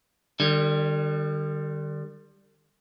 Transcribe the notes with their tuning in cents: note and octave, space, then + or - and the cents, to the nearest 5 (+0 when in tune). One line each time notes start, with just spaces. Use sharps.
D3 +45 G3 +0